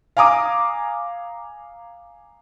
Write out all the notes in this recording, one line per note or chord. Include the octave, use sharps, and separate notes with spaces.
F5 G#5 A#5 D6 D#6